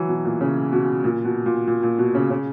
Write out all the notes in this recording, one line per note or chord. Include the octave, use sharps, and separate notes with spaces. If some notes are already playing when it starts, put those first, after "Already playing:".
Already playing: E3 F#3
B2
A#2
C#3
B2
A#2
B2
A#2
A#2
A#2
B2
C#3
C#3